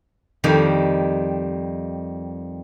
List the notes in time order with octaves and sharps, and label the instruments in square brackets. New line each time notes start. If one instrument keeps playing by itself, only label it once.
[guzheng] F2 D#3 G3